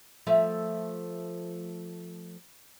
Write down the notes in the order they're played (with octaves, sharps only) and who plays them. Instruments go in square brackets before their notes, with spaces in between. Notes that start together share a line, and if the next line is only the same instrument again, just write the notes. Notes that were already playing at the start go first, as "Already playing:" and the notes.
[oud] F3 A3 E5